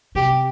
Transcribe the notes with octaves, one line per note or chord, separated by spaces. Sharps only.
C3 G4